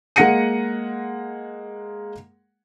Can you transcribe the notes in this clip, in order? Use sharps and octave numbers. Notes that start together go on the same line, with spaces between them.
G#3 A#3 F#5 A#6 C#7 D#7